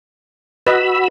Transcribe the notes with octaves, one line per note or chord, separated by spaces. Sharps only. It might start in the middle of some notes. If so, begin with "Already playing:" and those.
F#4 B4 D#5 B5 E6